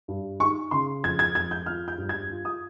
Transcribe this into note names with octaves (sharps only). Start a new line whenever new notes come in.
G2
D#4 C#6
C#3 C6
F2 G#6
G#6
F2 G#6
G6
F4 F6
G6
G2
G#6
F4
D#6